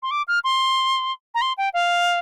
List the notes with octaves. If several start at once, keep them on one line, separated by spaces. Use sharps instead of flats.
C6
D6
F6
C6
A#5
C6
G5
F5